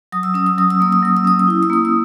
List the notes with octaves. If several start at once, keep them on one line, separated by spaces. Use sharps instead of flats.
F#3 D#6
E6
C#4 D#6
E6
F#3 D#6
E6
A#3 D#6
E6
F#3 D#6
E6
C#4 D#6
E6
E4 D#6
E6
A#3 D#6
E6